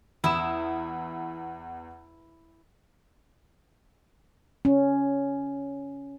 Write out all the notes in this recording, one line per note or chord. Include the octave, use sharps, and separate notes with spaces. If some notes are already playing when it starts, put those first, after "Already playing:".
E2 E4 D#6 E7
C#4